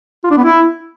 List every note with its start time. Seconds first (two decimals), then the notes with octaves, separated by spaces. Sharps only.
0.24 F4
0.31 D4
0.37 B3
0.44 E4